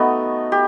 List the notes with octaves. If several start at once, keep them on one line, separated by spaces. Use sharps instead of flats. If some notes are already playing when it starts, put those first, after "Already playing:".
Already playing: A3 B3 D#4 F#4
G4